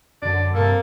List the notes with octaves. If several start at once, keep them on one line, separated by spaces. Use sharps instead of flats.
F#2 D3 D5
G2 C3 A#3 A4